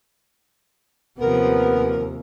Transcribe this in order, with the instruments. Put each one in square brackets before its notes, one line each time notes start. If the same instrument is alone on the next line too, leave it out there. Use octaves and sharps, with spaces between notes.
[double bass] D#2 [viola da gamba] C3 F3 [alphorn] B3 [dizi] A#4